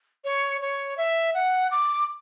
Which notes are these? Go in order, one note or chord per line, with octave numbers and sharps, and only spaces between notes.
C#5
C#5
E5
F#5
D6